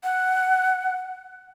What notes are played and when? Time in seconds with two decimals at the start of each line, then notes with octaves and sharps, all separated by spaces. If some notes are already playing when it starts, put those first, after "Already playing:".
0.04 F#5